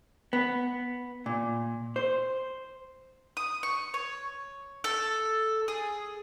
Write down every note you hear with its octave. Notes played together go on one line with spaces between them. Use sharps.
B3
A#2
C5
D#6
C#6
C#5
A4
G#4